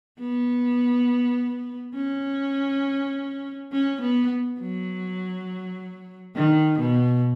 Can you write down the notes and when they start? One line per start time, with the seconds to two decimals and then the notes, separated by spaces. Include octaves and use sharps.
0.19 B3
1.95 C#4
3.72 C#4
4.01 B3
4.60 F#3
6.35 D#3
6.79 B2